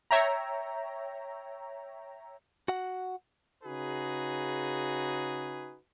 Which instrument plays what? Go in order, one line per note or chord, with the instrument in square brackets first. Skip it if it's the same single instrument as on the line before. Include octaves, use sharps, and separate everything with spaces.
[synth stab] C#5 E5 G5 A#5
[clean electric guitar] F#4 F#5
[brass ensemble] C#3 D#4 F#4 G#4 B4